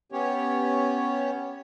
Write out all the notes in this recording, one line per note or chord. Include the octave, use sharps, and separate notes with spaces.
B3 C#4 G4 C#5